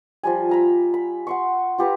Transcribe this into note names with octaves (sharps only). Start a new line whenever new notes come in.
F3 G3 G#5
E5 A#5 B5
B5
F#5 C6 C#6
F4 G4 B4 A#5